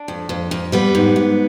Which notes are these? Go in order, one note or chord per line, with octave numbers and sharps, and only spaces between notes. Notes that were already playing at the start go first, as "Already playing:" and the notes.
Already playing: D4
F2
F2
F2
G3 B3
G#2
G#2